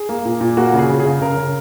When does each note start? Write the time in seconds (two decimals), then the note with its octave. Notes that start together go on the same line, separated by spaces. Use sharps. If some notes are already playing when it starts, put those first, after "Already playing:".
Already playing: G#4
0.09 A#3
0.25 A#2
0.41 A#2
0.57 A#3 F#4
0.73 C#3
0.79 G#4
0.89 C#3
1.00 G#4
1.06 C#3
1.21 C#3 A#4
1.37 C#3